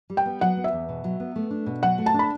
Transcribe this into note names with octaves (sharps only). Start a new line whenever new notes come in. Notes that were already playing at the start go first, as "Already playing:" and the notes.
G3
G5
B3
F#3 F#5
B3
E5
E2
B2
F#3
B3
A3
D4
B2
F#3 F#5
A3
A5
D4
B5